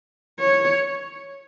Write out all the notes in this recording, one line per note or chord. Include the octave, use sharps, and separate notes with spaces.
C#5